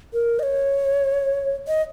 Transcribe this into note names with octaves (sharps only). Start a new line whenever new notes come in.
A#4
D#5
C#5
D#5